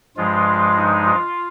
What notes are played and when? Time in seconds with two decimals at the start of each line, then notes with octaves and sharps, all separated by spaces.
0.17 G2 F3 G#3 F4
0.76 D#4
1.06 F4